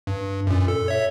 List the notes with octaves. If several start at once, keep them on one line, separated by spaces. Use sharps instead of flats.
G2
F#2 A#2
A4
C#5 E5